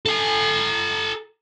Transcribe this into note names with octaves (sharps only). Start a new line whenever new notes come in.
A4 G#5